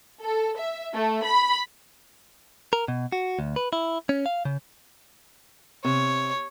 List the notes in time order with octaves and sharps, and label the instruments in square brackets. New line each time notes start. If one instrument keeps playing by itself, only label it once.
[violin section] A4
E5
A3
B5
[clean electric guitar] A#4
B2
F#4
D2
B4
E4
C#4
F5
C#3
[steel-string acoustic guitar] C3 [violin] C#5